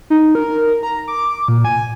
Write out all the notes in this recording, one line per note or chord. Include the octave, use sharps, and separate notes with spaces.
D#4
A#4
A#5
D6
A#2
G#5